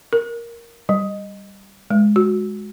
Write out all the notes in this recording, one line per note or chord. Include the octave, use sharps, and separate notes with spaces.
A#4
G3
G#3
F#4